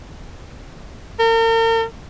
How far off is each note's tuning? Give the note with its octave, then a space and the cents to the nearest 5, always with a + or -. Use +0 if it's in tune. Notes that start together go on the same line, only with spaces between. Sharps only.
A#4 -40